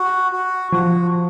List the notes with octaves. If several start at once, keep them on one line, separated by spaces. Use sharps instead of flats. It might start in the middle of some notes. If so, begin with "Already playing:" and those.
Already playing: F#4
F#4
F3 F#4